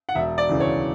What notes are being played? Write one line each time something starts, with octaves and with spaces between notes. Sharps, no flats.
F#5
E1 E5
D5
D2 C#3 E3
C#5